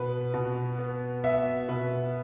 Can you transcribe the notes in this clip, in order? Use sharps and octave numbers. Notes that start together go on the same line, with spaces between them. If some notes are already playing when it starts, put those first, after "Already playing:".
Already playing: B2 B4
B2
B3
B3 E5
B2 B4